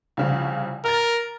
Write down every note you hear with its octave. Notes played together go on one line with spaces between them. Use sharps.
C2 C#3 F3
A#4 F6 A6